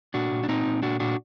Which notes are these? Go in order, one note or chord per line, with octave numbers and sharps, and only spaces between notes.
A#2 D4 F#4
A#2
D4
A#2 C4 D#4
A#2
A#2 D4 F#4
A#2 D4 F#4